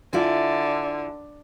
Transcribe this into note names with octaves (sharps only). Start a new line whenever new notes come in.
D3 E4 F4 G#5